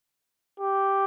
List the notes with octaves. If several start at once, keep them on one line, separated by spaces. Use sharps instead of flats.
G4